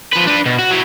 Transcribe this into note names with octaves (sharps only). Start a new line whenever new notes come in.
F3 B4
D4 B4
B2
F#4
F#3 E4